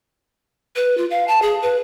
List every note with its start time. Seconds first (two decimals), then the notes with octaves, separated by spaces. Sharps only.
0.76 B4
0.97 F4
1.11 F5
1.28 A5
1.42 G#4
1.62 B4